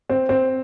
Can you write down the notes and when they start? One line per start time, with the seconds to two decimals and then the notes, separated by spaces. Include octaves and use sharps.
0.09 C4
0.29 C4